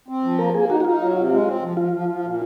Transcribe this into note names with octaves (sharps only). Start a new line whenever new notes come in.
C4
F3
A#3 A#4
A#3 G#4
D#4 F#4
F#4
D#4 F4
F#3
C3
G#3
C4
F3
F3 F4
F3
F3
A#2